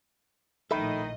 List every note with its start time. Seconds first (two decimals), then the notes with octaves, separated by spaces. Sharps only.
0.71 A#1 A2 D#3 A4 D#5 E5 B5